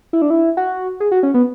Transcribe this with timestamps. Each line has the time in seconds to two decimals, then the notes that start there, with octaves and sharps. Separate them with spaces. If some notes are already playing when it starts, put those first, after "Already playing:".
0.13 E4
0.22 D4
0.30 E4
0.57 F#4
1.00 G#4
1.11 F#4
1.23 C#4
1.34 B3